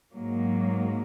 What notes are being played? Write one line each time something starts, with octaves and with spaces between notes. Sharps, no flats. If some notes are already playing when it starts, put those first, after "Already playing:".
G#2 F#3 A#3